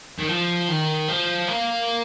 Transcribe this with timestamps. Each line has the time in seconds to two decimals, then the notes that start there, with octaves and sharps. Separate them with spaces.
0.19 D#3
0.29 F3
0.68 D#3
1.08 F3
1.48 A#3